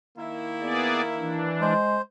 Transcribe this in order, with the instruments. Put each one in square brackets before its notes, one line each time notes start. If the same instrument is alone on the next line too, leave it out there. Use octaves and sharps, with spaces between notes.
[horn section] D#3 A#3 E4
[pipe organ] B3 G#4 D5
E3 D4
[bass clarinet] G#3 [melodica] C5